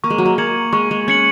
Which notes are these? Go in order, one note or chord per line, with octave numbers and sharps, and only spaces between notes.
A#3 C#6
G#3
F#3
G#3
A#3 G#6 C#7 F#7
G#3 C#6
G#3
C#4 G#6 C#7 F#7